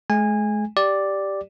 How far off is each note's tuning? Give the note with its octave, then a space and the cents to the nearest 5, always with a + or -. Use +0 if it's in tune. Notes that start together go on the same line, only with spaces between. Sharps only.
G#3 +40 G#5 -20
G4 +0 D5 +0